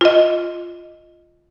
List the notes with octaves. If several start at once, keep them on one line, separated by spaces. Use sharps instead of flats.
F4 D#5